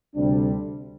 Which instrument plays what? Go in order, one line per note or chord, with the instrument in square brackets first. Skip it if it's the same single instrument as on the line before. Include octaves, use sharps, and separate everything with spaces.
[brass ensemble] D2 C3 G3 D4